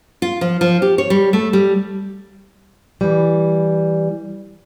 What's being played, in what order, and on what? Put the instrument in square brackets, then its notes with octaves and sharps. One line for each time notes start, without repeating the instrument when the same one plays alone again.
[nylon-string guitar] F4
F3
F3
G4
C#5
G3
A3
G3
[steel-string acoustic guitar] E3 G3